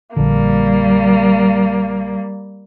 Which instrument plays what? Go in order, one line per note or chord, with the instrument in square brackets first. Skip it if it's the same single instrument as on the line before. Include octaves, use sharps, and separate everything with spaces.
[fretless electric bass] A#1 D3 [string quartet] G3 A#3